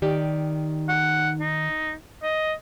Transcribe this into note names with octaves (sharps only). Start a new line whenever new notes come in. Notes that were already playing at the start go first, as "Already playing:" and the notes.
D#3 G4 D5
F#5
D#4
D#5